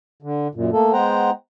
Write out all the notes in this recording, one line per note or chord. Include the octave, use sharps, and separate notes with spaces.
D3
F#2 A#2
A3 A#3 A4
G#3 B3 C5 F#5 G5 A#5